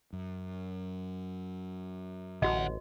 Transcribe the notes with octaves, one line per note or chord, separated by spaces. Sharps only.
F#2
A1 D2 F#4 D#5 F#5